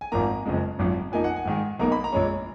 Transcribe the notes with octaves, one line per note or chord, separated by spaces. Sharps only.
G#5
G#1 G#2 F3 A#3 A#5
F#1 F2 C#3 G#3
G#1 F#2 F3
F2 F3 A#3 D#4 G#5
F#5
G#5
G#2 D#3 G#3
B1 B2 A#3 D#4 A#5
B5
A#5
A#1 A#2 G#3 C#4